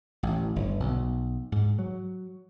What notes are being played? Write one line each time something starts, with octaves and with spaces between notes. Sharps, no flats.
A1
G1
B1
G#2
F#3